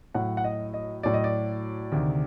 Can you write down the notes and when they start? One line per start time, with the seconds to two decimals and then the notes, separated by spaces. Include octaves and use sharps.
0.14 A2 F#3 F#5
0.37 F#5
0.44 D#5
0.74 D#5
1.03 A2 F#3 D5
1.14 D#5
1.24 D5
1.92 D2 C3 D#3